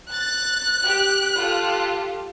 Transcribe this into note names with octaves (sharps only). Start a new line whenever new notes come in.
F#6 A6
G4
F4 G4 A4